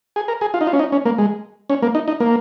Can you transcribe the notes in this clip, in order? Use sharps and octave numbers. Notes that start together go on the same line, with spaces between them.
G#4
A#4
G#4
F4
D#4
F4
C#4
D#4
C#4
A#3
G#3
C#4
A#3
D#4
D#4
A#3